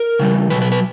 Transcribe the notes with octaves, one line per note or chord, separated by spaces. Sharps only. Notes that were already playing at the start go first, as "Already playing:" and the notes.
Already playing: A#4
C#3 E3 G3
B2 F#3 B4
B4
B4